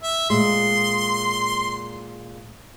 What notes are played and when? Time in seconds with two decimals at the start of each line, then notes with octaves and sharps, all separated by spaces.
0.03 E5
0.30 A#2 G#3 C6